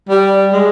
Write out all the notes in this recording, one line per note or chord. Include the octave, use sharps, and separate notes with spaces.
G3
G#3